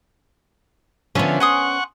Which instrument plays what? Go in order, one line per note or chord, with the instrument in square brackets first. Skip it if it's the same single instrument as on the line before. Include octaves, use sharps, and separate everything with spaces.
[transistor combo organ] D3 F3 [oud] B3 C#4 [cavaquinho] A4 C#5 E5
[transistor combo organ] F#5 C#6 [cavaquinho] G#5 C6 D#6